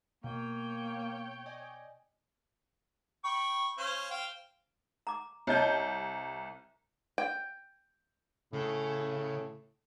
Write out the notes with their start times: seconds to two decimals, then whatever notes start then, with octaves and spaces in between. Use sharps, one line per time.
0.24 B2 A#3 C#5 G5
1.46 D5 D#5 G#5
3.24 G5 B5 C#6
3.78 C#4 C5 F5
4.11 C5 F5 G5
5.07 A#5 D6
5.47 C2 C#5 D#5 A5 G6
7.18 G5
8.53 A2 C#3